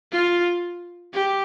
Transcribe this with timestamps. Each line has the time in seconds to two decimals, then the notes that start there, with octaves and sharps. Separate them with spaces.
0.12 F4
1.13 G4